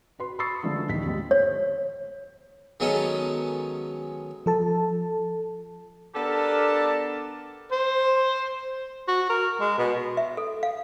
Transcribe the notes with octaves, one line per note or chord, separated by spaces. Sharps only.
F#4 B4 C6
B5 C#6 D#6 E6 A6 C7
D3 E3 F3 G#3 A3
D#1 D#3 B6
D#2 G#2
C#5
D#3 F#3 G#3 B3 C#4 A4
F3 A4 A5
B3 D4 G4 A4 A#4 A5
C5
F#4
A#4
G#3
B2
E5
A4
F5